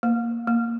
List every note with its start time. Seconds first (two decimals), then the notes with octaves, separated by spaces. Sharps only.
0.03 A#3
0.47 A#3